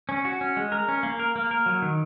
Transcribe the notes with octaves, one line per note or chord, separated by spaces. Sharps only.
C#4
F#4
C#4
G#3
A#4
C#4
A#3
A#4
A#3
A#4
F#3
D#3